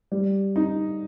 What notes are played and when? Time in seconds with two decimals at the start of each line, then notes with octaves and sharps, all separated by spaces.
0.12 G3
0.56 D#4